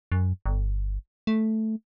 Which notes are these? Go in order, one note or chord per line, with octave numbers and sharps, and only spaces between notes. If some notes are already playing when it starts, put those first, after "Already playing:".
F#2
G1
A3